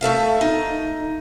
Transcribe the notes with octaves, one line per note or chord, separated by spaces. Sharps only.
A3 A4 E5 F5
D#4